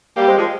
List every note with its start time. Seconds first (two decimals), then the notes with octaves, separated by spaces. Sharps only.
0.17 G3 A#3 G4
0.28 G#3 C4
0.38 F3 G#3